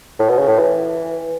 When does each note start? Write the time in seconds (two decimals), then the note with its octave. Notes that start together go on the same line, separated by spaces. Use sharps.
0.19 A2
0.29 B2
0.39 C#3
0.48 A2
0.59 E3